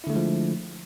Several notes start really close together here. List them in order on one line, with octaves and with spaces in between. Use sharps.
E4 D3 A3 G#3 F3